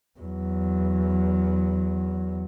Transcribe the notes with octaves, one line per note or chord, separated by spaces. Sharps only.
E2 F#3